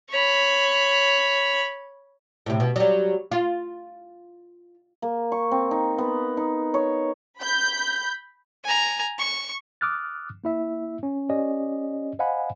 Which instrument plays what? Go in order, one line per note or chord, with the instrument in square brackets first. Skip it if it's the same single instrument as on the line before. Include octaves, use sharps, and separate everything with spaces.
[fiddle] C#5 B5
[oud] A2 C3
B2
F#3 G3
F4
[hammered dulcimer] A#3
C#6
C4
D#4
B3
D#4
C#5
[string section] B5 G6
[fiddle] G#5 A#5
C#6
[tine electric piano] D6 D#6 F6 F#6 A6
A#3 E4 E5
C#4
C#4 G4 D5 D#5
C5 D#5 F5 F#5 G#5 B5